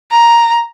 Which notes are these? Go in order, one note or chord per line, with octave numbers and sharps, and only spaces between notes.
A#5